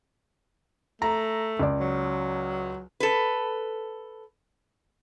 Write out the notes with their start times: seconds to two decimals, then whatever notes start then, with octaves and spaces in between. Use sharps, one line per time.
1.02 A3 A#5
1.60 C#2 D5
1.80 F#3
3.00 A4 B4